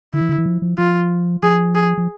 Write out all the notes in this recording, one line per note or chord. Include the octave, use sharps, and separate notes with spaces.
D3 E4
E3
D3
E3
F3
F3
F3 F4
F3 G#4
G#4
F3